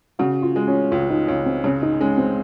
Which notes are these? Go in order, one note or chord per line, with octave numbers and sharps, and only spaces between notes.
C#3 F#4
F4
G#3
C#4
C#2 F4
D#4
C#2 C#4
C4
C#3 C#4
D#4
G#3 C#4
C4